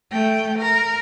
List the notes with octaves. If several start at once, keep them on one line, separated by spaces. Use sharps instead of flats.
A3 G5
A#4